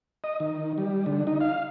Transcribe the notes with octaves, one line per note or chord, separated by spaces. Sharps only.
D#5
D#3
G3
D3
D#4
F5